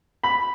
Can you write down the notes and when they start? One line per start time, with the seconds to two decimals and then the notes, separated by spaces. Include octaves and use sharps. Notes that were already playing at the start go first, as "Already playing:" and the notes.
0.24 B5